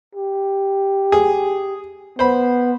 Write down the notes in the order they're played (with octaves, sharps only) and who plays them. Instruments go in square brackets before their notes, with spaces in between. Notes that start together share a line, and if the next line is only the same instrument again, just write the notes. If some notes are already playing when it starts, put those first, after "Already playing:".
[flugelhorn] G4
[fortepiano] G#4
[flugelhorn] B3 [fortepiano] C5 B5